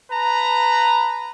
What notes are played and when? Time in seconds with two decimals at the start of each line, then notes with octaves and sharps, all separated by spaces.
0.11 B4 A5 A#5